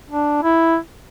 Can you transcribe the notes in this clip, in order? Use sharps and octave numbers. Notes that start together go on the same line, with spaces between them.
D4
E4